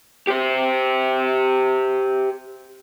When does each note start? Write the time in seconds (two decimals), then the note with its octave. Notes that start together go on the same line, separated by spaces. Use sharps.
0.27 G4 C5